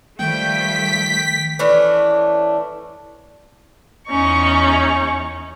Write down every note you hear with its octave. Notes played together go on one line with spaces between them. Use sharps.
D#3 F3 G3 A3 G5 B6
E3 A3 C#4 D4
E2 C#4 D#4 C#6